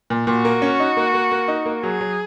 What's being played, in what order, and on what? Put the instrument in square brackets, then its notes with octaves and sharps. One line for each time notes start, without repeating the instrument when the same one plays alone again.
[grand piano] A#2
[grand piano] A#2 [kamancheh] F#4
[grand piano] A#3
C#4
D#4
A#3
A#3
A#3
D#4
A#3
[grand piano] F#3 [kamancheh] G#4
[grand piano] F#3